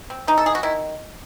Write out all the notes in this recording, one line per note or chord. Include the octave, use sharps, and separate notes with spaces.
C4
E3 D#4
A4
E3 G#4
F#4
D#3 E4